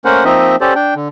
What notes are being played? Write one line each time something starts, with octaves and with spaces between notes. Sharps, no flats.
A3 A#3 C#4 A#4 C5 F#5
F3 A#3 C4 D#4 D#5 E5
C#4 G4 A4 C5 D5
D4 G5
D3